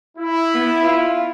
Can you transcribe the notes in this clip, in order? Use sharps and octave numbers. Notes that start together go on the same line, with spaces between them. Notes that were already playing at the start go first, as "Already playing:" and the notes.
E4
B3
F4